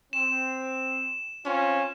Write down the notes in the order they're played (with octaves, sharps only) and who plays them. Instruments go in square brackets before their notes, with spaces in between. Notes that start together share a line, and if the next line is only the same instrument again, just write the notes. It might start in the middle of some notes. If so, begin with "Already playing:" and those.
[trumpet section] C4 [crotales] E7
[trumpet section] C4 F4 [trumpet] C#4